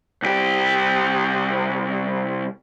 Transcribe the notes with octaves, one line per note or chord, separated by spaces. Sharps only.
C2 G4